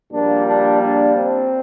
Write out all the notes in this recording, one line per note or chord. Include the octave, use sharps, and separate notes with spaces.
A#1 A#2 G3 A#3 D4
D4
D4
C4